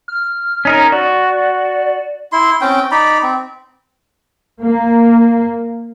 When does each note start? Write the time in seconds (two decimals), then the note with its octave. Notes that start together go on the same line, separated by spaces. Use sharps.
0.08 F6
0.65 C#4 D#4 A#4
0.92 F#4 D5
2.32 E4 C6
2.61 C4 C#4 G5
2.91 D#4 D5 B5
3.23 C4
4.62 A#3